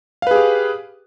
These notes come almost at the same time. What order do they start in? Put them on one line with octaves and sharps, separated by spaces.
F5 B4 G#4 G4